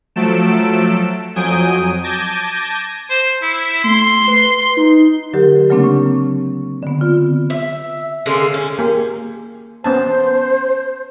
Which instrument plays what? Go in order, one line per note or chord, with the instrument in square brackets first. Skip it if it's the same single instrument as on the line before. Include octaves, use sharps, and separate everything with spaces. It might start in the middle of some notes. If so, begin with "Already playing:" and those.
[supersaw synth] F3 F#3 A3 A4 D7 E7
F2 F#3 G#5 D#6 G6 D7
A5 D6 G6 G#6 A#6 D#7
[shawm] C5
E4
[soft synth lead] A3 [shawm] C6
[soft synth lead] B4
D#4
[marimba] D3 F#3 G4 A#4
C#3 F#3 A3 A#3 C4 D4
C#6
D3 B3
C4 F4
[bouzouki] E5
D3 G#3 A#3 C#4
C#4
[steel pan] A#3 G4 G#4
[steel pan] B3 C#4 A5 [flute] C5